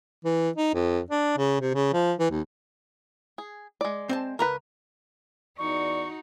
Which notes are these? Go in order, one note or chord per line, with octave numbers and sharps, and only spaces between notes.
E3
D#4
F2
D4
C#3
C3
C#3
F3
E3
D#2
G#4
G#3 D5
C4 C5 A5
C#2 A#4 B4 A#5
E2 D#4 F#4 D5 C#6